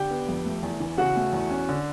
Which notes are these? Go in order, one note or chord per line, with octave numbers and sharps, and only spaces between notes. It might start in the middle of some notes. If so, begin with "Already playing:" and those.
Already playing: D3 G4 G5
B3
F2
A3
E2
E3
C#3 F#4 F#5
A3
E2
C#4
D3